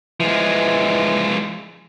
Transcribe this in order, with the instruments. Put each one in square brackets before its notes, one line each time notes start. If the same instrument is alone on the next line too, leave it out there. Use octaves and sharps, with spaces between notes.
[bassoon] E3 [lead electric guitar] F3 G#3